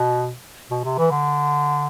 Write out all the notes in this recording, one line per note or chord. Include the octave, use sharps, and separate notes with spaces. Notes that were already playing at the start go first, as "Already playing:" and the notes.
Already playing: B2
B2
C3
E3
D3